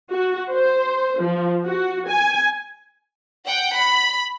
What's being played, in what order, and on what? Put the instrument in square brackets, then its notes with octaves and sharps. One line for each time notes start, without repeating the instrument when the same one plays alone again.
[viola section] F#4
C5
F3
F#4
G#5
[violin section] F#5 G5
B5